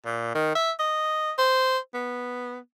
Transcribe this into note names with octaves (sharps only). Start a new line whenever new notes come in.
A#2
D#3
E5
D#5
C5
B3